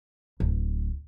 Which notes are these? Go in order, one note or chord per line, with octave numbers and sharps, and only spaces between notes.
D1